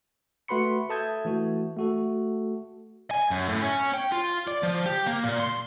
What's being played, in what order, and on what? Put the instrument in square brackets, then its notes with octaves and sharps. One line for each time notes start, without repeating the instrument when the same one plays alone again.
[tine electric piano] A3 F#4 B4 B5 C6 C#7
A4 E5 A5 D#6 G6 G#6
E3 A3 F#4
A3 F#4 A4
[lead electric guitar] G#5
F#2
A2
C#4
G5
F4
D5
F3
G4
A#3
A#2
C6